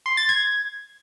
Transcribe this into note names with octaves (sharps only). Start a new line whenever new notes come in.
C6
A6
G#6